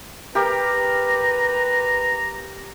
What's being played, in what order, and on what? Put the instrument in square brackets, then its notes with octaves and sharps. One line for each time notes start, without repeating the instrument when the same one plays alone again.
[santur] G4 A#4 [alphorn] B4 [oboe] A#5